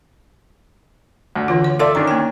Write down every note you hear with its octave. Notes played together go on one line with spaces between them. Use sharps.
D2
D3 E3 F4
C#5
A4 D5 E5 F5 A5 C6
D#3 C#4 D4 A#5
A#3 G5